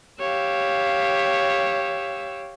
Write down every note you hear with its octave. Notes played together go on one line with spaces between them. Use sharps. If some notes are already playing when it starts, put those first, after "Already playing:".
G4 C#5 F5 E6